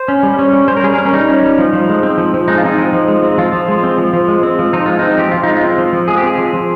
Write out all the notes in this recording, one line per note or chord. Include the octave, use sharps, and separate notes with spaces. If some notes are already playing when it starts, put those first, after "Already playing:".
Already playing: C5
C#4
G3
C#4
G3
C#4 C5
A#4
G3 G#4
C#4 A#4
C#4
G3 D#4
C#4
G3
F3
F3
G#3
C4
F3
F3
G#3 D#4
F4
C4 D#4
F3
F3
G#3
C4
F3 F4
F3
G#3
C4
F3
F3
G#3
C4
F3
F3 D#4
G#3 F4
C4 D#4
F3 G4
F3 F4
G#3 D#4
F4
C4
F3
F3
G#3 G#4
G4
C4 G#4
F3
F3